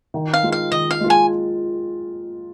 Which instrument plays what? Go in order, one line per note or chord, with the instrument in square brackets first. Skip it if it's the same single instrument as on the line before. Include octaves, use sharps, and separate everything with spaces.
[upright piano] D#3
[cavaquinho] F5
[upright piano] G#3 F4
[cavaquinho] F5
[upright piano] D#3 [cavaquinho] D#5
[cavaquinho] F5
[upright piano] G#3 F4
[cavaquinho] G#5